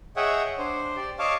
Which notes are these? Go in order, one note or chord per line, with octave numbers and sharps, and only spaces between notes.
G#4 C#5 D#5 E5 F#5 G5
D4 C5
G4 D5
C#5 D#5 F5 A5 C#6 D6